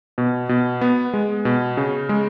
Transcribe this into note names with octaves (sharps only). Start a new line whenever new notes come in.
B2
B2
B3
G#3
B2
C#3
G#3